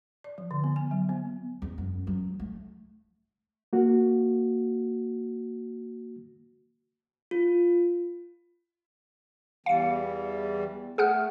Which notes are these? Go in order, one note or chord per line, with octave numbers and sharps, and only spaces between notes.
D5
F3
D3
B3
G#5
F#3
B3
E2
F#2
F#3
A3
A#3 F#4
F4
E2 E3 G3 F5 C#7
A3 G#4 F#5 F6